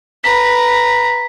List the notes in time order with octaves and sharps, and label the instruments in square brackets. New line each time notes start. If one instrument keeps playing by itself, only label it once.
[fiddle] B4 A#5 [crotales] B6